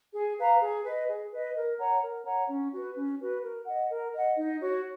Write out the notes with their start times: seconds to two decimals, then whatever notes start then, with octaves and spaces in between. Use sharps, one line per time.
0.14 G#4
0.38 B4 F5 A#5
0.62 G#4
0.85 B4 D#5
1.09 G#4
1.32 B4 D#5
1.55 A#4
1.79 C#5 F#5 A#5
2.02 A#4
2.25 C#5 F#5 A#5
2.48 C#4
2.72 F#4 B4
2.96 C#4
3.19 F#4 B4
3.42 A#4
3.66 D#5 F#5
3.89 A#4
4.13 D#5 F#5
4.37 D#4
4.61 F#4 C#5